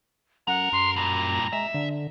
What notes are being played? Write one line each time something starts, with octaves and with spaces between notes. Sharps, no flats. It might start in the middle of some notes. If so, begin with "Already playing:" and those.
F#2 A4 F#5 A#5
F#2 C6
G2 A#2 A#5
G#3 E5
D3